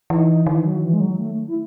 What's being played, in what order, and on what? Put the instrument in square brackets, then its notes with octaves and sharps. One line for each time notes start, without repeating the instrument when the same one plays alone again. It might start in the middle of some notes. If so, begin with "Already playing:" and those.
[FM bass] E3 [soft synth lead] D#4
[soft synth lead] D#4
[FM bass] D#3 [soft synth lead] E3
[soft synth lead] F#3
E3
G#3
F#3
A3
E4